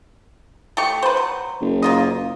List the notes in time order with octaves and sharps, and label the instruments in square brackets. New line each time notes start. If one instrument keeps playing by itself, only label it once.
[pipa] A3 G4 C#6
B4 C5
F#3
[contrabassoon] F#1
[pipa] A#3 F4 D#5